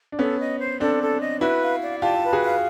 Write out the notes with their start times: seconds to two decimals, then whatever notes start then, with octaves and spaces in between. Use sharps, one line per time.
0.12 D4
0.19 B3 C#4 A4
0.39 D#5
0.60 C5
0.80 C4 D4 A4
1.01 A4
1.20 D#5
1.41 E4 F#4 B4
1.62 F5
1.82 D5
2.02 F4 G4 A5
2.23 B4
2.33 F#4 G#4
2.43 F5